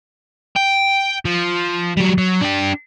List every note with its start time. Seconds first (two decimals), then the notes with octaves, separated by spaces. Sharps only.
0.56 G5
1.25 F3
1.97 F#3 G3
2.18 F#3
2.41 D4 G4